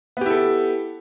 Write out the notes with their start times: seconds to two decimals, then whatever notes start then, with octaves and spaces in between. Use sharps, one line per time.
0.17 B3
0.21 G4
0.26 E4
0.30 A4